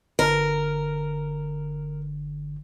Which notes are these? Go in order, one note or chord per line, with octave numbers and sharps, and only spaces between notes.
G1 D3 A#4